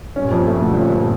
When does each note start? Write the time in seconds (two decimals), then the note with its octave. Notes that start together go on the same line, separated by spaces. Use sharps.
0.16 G2 A#2 C#4
0.31 F2
0.47 A3
0.62 G2 A#2 D3
0.78 C#4